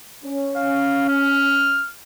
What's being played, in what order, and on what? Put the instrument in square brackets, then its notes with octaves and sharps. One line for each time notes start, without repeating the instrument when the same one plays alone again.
[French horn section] C#4
[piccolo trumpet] F5
F6